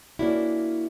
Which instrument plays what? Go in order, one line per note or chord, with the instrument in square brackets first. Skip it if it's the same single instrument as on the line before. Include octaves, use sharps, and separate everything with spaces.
[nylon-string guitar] A#3 E4 [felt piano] C#4 D4 F#4